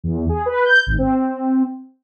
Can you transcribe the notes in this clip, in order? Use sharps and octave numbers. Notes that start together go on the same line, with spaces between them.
E2
G#4
B4
G6
G#1
C4